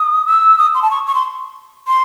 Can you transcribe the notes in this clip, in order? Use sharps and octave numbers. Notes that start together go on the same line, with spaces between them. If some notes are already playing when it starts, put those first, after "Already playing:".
Already playing: D#6
E6
D#6
C6
A5
C#6
C#6
C6
C6